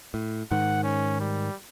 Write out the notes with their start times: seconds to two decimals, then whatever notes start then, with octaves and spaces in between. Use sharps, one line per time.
0.14 A2
0.51 G#2 D#3 F#5
0.84 C#4
1.20 G3